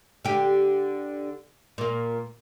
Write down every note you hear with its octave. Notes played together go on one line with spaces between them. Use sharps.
D3 G4
A#2 A#3